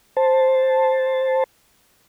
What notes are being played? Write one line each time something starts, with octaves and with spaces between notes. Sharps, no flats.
C5 A5